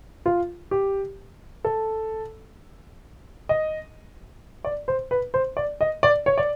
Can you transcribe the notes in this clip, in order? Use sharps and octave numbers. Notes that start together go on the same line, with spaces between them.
F4
G4
A4
D#5
D5
C5
B4
C5
D5
D#5
D5
C#5
D5